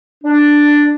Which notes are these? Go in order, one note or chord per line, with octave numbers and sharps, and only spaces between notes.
D4